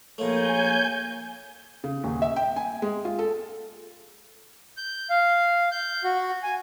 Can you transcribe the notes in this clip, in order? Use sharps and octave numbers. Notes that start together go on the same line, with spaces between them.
A#1 A3 A#4 C#5 F5 G#5 G6
C#3
D#1
E5
G5
G#5
G#3
F4
A4
G6
F5
G6
F#4
G#5